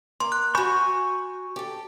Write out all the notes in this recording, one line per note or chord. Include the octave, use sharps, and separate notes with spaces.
A#3 C6
F#6
F#4 G#5 B5 C#6 G6
G4 A4